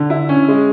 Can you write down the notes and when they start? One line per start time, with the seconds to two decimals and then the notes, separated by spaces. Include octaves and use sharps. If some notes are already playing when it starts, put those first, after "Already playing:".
Already playing: D3
0.10 E4
0.29 C#4
0.49 G#3